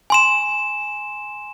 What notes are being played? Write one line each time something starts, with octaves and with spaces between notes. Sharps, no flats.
G#5 C6 E7